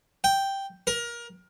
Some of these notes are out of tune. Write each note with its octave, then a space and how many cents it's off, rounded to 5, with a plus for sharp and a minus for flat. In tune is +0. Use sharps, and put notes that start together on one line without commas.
G5 +0
A#4 +25